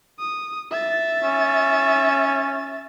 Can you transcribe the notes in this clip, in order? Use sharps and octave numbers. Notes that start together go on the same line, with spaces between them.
D#6
E5 A6
C#4